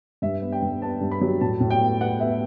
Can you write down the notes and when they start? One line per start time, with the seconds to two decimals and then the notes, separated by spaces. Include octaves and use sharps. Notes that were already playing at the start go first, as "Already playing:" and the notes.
0.22 G2 E5
0.42 B3
0.52 G5
0.62 G2
0.82 B3 A5
1.01 G2
1.11 B5
1.21 F#3
1.41 A2 A5
1.60 A2
1.70 G5
1.81 B3
2.01 B3 F#5
2.20 B3 E5